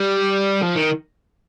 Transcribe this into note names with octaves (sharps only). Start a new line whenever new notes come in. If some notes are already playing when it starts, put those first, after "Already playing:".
Already playing: G3
F3
D#3